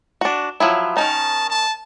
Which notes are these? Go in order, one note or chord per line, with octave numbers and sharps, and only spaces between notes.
D4 F#4
F3 F#3 E4
D#3 C#4 D#4 A5
A5